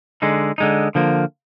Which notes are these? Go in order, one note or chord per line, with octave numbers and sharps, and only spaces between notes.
D3 G#3 D#4
D3 G#3 D#4
D3 F3 A#3